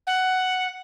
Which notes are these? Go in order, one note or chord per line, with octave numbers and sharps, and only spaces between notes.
F#5